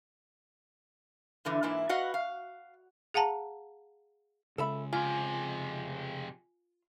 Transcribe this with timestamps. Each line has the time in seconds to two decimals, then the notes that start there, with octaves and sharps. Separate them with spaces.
1.45 G2 D3 E3
1.63 G#2 E3 A#3 E4
1.89 F#4 B4 D#5 F5 F#5
2.14 F5
3.14 G#4 F5 F#5 A5 A#5
4.58 C#3 G#3 A4 E5 B5
4.93 F2 C3 F4 G#5